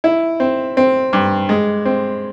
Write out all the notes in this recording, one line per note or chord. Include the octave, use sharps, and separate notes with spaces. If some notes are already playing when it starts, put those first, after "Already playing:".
E4
C4
C4
G2
G#3
C4